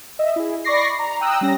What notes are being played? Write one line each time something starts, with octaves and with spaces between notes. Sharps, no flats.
D#5 E5
E4 G#4
D5 B5 C#6 D6 A#6 C7
A#5
G5 A#5 D#6 E6 F#6
G3 C#4 A#6